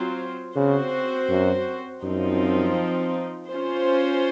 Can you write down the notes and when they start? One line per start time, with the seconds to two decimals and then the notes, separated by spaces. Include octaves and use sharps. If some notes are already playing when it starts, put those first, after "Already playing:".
Already playing: F#3 C4 F4 C5
0.55 C#3 C4 F#4 C5
1.29 F#2
2.03 F#2 F3 C4 D#4
3.49 C#4 F4 C5